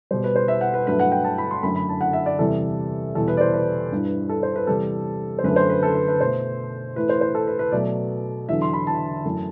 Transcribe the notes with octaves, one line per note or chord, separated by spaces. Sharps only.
B2 G3 C5
B4
C5
E5
F#5
B4
G2 F#3 A3 B4
F#5
G5
A5
B5
C6
F#2 D3 A3 B5
B5
A5
F#5
E5
D5
E2 C3 G3 A4
E2 B2 G3 A4
B4
D5
C5
B4
G2 E3 G3
A4
C5
B4
E2 C3 G3 A4
C5
F#2 D3 A3 B4
C5
B4
A4
B4
B4
B2 A3 C5
A2 E3 A3 B4
C5
C5
A4
B4
B4
B2 F#3 A3 D5
E2 D3 F#3 E5
C6
B5
A5
F#2 E3 A3